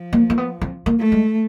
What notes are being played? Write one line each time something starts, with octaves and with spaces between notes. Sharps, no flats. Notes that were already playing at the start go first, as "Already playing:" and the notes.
Already playing: F3
A#3
A#3
B3
C4
A#3
A3
G#3